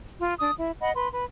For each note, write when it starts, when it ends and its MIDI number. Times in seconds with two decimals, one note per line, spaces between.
0.19 0.34 65
0.40 0.52 62
0.40 0.52 87
0.58 0.72 64
0.81 0.91 75
0.81 0.91 78
0.81 0.91 83
0.95 1.08 71
0.95 1.08 84
1.11 1.26 71